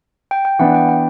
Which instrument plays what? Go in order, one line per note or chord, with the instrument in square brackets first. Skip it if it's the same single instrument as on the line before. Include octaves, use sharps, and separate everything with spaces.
[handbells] G5
G5
[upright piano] E3 B3 D4 [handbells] F#5
[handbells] G5
G5